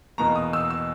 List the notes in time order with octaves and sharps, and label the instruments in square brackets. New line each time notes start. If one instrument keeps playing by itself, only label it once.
[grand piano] E2 B2 A#3 D#4 A#5
D#6
E6
E6